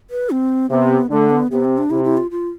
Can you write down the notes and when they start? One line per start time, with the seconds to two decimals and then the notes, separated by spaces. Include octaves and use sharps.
0.10 B4
0.30 C4
0.70 C3 B3
1.10 D3 A3
1.30 B3
1.51 C3 B3
1.65 C4
1.78 D4
1.90 C3 E4
2.04 E4
2.17 F4
2.31 F4